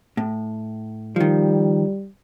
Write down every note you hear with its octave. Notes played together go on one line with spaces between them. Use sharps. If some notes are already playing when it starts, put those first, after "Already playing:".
A2
D#3 F3 G3